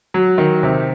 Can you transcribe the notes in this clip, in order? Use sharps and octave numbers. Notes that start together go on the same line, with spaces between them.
F#3
D#3
C3